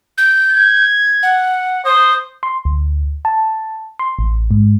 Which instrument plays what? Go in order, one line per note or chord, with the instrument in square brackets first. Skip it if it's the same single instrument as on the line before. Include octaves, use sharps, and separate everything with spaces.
[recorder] G6
[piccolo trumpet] G#6
[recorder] F#5
[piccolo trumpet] C5 [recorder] D#6
[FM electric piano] C6
D2
A5
C6
A1
G#2